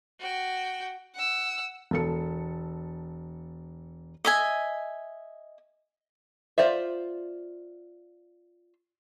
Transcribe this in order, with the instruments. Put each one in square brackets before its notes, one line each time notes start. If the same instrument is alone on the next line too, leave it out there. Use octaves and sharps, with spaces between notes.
[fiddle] F#4 G5
[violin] F#5 E6
[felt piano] E1 A4 C#7
[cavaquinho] D#5 E5 G#5
[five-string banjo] F4 C5 D5 E5